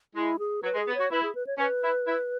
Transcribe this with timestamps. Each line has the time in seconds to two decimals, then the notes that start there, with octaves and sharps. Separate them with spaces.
0.15 G#3 E4
0.39 G#4
0.63 F#3 B4
0.75 G#3
0.79 G#4
0.88 B3
0.95 C#5
1.00 F#4
1.11 E4 B4
1.23 G#4
1.35 B4
1.47 C#5
1.58 C#4 B4
1.83 E4
2.07 E4